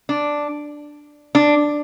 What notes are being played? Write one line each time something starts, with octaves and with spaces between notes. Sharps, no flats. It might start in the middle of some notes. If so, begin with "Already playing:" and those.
D4
D4